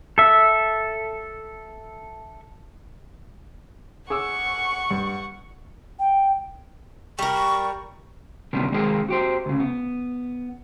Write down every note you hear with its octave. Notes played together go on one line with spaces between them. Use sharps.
A4 E5
G#4 F#5 C#6 D6 E6
G2 G3
G5
G3 A#4 C#6
D2 C3 D#3 G3 B3 C#4
D#3 G#3 A#3 C4 G#4 B4
F#4 G4 C5
D2 C#3
B3